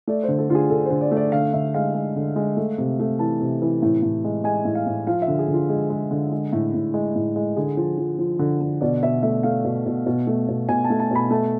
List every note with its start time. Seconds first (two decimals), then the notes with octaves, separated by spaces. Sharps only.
0.07 A3 D5
0.23 C5
0.28 D3
0.39 A4
0.50 D3 F4
0.55 G#4
0.70 D3 A4
0.86 D3 C5
1.01 D5
1.11 A3
1.17 D5
1.32 D3 F5
1.53 D3 E5
1.74 G#3 F5
1.94 G#3
2.16 D3
2.36 G#3
2.57 A3
2.78 C3
3.00 A3
3.19 E3 A5
3.40 C3
3.62 E3
3.82 A2
4.02 A2
4.24 G#3
4.44 G#3 G#5
4.65 A2
4.75 F5
4.87 A2
5.07 F3 F5
5.22 E5
5.28 D3
5.39 G#4
5.48 D3
5.54 F4
5.69 G#3 G#4
5.90 G#3
6.11 D3
6.31 G#3
6.53 A2
6.74 A2
6.94 G#3
7.15 A2
7.36 G#3
7.56 D3 G#4
7.77 F3
7.98 F3
8.19 F3
8.39 D3
8.61 D3
8.81 B2 D5
9.03 B2 E5
9.22 A3 E5
9.43 A3 F5
9.64 B2
9.86 B2
10.06 B2
10.27 A3
10.48 B2
10.68 B2 G#5
10.84 A5
10.90 A3
11.00 A5
11.11 B2 B5
11.31 A3 A5